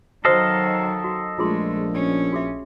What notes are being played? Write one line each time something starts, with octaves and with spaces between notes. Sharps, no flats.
D#3 F#3 F#4 A4 C5 D#5 F5
F#4
A#1 G#3 A3 F4 G#4 C6
C#4
F#4 G#4 E5